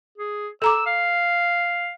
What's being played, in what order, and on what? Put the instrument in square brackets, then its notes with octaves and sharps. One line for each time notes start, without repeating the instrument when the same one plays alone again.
[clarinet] G#4
[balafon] A4 A#5 D6 [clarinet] E6
[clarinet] F5